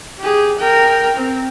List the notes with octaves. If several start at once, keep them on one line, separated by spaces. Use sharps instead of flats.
G4 G#4
A#4 G5
C4